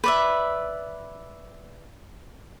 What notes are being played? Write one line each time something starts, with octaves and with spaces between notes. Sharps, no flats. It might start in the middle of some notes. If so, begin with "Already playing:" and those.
B4 D5 E5